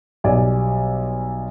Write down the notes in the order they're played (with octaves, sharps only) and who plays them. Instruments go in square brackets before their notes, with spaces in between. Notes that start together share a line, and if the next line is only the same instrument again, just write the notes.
[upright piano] B1 G3 D5 G#5